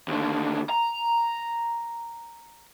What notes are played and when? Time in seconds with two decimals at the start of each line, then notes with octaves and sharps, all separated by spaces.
0.08 D#2 D3
0.70 A#5